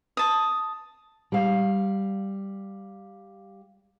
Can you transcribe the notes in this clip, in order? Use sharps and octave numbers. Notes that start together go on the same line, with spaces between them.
A5 D#6
G3 F5